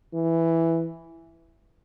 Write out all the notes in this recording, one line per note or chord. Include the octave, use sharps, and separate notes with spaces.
E3